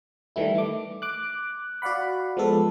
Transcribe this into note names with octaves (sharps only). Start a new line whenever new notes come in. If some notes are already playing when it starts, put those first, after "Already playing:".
D#3 E3 G3 A3 E4
A3 D6
D6 F#6
F#4 D5 F5 F#5 B5
F3 G#3 B3 A4